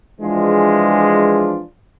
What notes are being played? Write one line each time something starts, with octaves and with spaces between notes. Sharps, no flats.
E3 F3 G#3 D4 F4 G#4